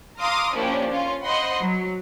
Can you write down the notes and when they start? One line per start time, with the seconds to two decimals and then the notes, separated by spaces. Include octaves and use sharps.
0.20 F5 A#5 C6 D6 D#6 F6
0.54 F3 A#3 C#4 D4 E4 G4
0.90 C#4 F4
1.23 C5 D#5 F#5 B5 C6
1.61 F#3